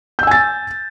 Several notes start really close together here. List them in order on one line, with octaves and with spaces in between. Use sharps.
G6 E6 G#5 A6